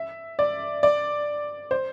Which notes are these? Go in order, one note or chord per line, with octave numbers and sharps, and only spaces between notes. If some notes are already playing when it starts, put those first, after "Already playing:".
Already playing: E5
D5
D5
C5